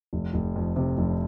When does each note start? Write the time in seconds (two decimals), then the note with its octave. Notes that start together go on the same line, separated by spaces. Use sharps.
0.13 F1
0.34 F1
0.56 F2
0.76 C3
0.98 F1